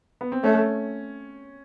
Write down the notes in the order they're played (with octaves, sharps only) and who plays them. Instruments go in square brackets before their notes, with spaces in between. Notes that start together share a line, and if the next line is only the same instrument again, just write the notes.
[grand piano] B3
C4
[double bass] A3 [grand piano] C#4